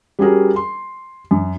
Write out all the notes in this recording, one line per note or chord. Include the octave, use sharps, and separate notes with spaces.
G3 C#4 F#4 G#4 A#4
C6
F#2